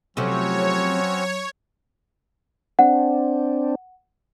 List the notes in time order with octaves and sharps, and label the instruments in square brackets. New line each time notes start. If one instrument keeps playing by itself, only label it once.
[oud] C3 F3 A3 [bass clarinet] F#3 [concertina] C4 C#4 F#4 [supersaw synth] C#5
[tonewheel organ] C4 D4 [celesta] F#5